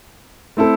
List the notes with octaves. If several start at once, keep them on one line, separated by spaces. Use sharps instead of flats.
A3 C4 E4 A4